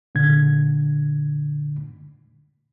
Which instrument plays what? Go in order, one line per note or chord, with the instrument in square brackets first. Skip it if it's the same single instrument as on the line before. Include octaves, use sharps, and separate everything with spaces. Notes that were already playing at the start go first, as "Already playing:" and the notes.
[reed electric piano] A#2 D3 G#6